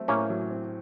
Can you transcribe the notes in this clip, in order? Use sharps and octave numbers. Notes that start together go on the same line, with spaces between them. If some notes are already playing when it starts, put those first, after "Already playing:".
Already playing: F#3 A3 C4
A2 A#3 C#4
F#3
C4